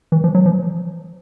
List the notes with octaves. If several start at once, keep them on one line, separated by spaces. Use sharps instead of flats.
E3
F3
F#3
F3